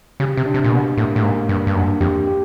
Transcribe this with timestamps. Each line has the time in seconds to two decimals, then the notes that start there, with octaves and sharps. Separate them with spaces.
0.20 C#3 G4
0.37 C3
0.46 D4
0.54 C3
0.64 A#2
0.71 B2 A#3
0.97 A2 A#3
1.16 A2
1.23 G#2 A#3
1.49 G2 A#3
1.67 G2
1.75 F#2 D4
2.01 F2 G4
2.27 G4